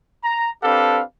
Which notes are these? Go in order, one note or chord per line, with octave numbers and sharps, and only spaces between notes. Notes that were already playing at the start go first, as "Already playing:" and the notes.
A#5
C4 D4 G4 A4 B4 F5